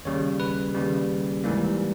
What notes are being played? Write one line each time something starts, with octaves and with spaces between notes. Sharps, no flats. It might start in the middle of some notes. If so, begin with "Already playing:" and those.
D#2 C#3 G3 C#5
B4
D#2 C#3 G3
G#2 E3 G3 A#3